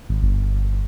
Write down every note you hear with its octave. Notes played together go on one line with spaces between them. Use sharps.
G#1
G1